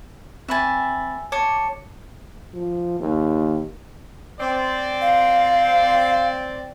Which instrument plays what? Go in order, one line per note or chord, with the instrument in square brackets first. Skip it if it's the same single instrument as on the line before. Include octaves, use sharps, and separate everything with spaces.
[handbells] C4 B5 A6 [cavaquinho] E5 G#5
[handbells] C#5 A5 C#7 [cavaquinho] D6
[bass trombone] F3
D#2
[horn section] C4 D5
[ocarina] F5